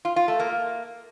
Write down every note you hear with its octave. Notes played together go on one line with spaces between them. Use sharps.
F4
F4
A3
A#3